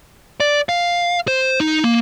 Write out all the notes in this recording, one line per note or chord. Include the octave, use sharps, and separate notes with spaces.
D5
F5
C5
D#4
A#3